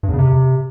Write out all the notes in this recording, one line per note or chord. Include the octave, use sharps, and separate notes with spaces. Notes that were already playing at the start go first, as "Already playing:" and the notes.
G2
E2
C#3
C3